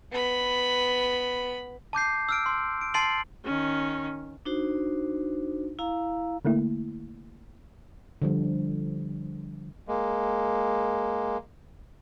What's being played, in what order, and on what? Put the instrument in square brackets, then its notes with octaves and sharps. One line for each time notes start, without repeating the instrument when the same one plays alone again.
[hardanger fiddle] B3 B5
[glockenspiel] A5 D6 G6 C7
E6 F6 D7
C6
D7
A5 C6 A6 C7 D7 F#7
[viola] D#3 C#4
[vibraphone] D4 D#4 F#4 C5
E4 F5 A#5
[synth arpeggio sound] D3 A3 A#3 E4
[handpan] D3 F3 G3
[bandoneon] G#3 A#3